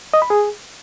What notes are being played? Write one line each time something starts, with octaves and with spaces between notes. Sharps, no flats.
D#5
B5
G#4